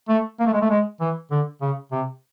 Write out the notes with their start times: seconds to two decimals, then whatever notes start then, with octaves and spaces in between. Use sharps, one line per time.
0.09 A3
0.40 A#3
0.47 A3
0.53 G#3
0.62 A3
0.70 G#3
1.01 E3
1.31 D3
1.61 C#3
1.92 C3